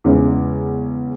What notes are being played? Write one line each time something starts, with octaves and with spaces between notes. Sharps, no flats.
E2 C#3 G#3 C#4 E4